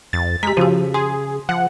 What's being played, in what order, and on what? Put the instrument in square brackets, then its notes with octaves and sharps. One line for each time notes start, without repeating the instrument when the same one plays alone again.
[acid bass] F2 [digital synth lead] A6
[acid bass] G#3 [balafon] G4 A#5 [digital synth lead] B6
[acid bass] C#3 [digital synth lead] F3 [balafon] F#4 G4
[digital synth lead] G#4 [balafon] C6
[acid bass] F3 [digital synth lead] F#5